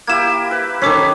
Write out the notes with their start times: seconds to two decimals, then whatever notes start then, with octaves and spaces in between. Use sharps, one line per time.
0.07 A#3 E4 G4 G#6 E7
0.51 B4
0.82 D#3 C#4 G#4 A4 D6 B6